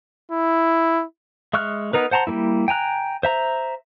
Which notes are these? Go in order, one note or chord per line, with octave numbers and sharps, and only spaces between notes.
E4
G#3 E5 C#6 F6 F#6
B3 D#4 A#4 B4
C5 F#5 A5 A#5 C6
G3 G#3 A#3 E4
G5 G#5 A#5 F#6
C5 E5 A#5